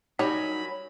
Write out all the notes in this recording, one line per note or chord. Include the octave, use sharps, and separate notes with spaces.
F#3 G3 C#4 D#4 A#4 C#5 B5